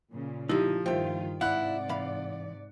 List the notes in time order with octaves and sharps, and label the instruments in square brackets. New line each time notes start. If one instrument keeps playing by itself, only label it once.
[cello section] A#2 C#3
[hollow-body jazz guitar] D2 D#4 [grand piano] F3 [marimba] E4 G4
[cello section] G2 D#3 F4 [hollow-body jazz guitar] F3 A3 [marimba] C5 [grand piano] G5
[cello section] G#2 C3 D5 [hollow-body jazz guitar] E4 F5 [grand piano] F#5 F#6
[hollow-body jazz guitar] E3 F5 B5